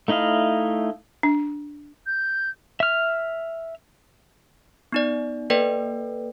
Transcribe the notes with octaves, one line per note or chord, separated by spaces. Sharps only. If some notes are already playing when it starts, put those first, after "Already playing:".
A3 D#4 E4 D#5 F5
D4
G6
E5 F6
B3 D#4 D5
A#3 A4 B4 D5 G5